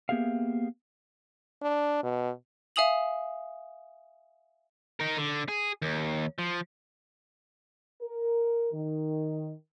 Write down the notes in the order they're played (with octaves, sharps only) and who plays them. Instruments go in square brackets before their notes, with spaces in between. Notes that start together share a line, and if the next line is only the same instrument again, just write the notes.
[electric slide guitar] A#3 B3 G4 G#4 E5 F5
[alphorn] D4
B2
[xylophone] E5 F5 G#5 D#6 F7 F#7
[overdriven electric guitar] D#4 A#4
D3
G#4
D#2
F3
[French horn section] A#4
D#3